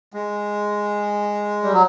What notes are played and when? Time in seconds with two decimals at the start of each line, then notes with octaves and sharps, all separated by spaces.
0.13 G#3
1.63 G3
1.73 F#3